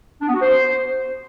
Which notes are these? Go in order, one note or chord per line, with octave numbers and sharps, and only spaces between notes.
D4
B3
F#4
C5